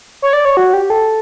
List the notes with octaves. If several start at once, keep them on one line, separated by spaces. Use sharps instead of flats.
C#5
D5
C#5
F#4
G4
A4